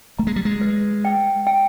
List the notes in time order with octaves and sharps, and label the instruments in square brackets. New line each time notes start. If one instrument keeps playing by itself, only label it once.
[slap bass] A3 [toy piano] A#5
[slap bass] G#3
G3
G#3
[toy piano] B4
G5
G5